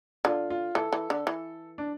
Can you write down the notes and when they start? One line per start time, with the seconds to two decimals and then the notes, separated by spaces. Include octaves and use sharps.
0.25 D3 F4
0.50 F4
0.75 E3 A4
0.93 E3
1.10 D3
1.27 E3
1.78 D4